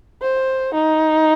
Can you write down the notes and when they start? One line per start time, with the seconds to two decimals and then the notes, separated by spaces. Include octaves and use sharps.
0.22 C5
0.74 D#4